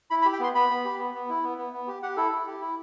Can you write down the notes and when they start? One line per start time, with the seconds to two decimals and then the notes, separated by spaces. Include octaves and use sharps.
0.10 E4 B5
0.22 B5
0.25 G4
0.33 G5
0.40 B3 C6
0.55 B3 B5
0.70 B3
0.85 G4
0.99 B3
1.14 B3
1.29 E4
1.44 B3
1.58 B3
1.73 B3
1.87 G4
2.02 G4 F#5
2.17 E4 A4
2.32 E4
2.47 G4
2.61 E4